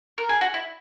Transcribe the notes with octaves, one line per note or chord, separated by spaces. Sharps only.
A#4
G#4
F#4
E4